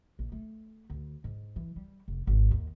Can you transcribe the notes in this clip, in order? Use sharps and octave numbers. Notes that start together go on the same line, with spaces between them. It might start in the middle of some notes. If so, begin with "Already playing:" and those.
A#1
A3
D2
G#2
E3
G3
F1
G#1
D#2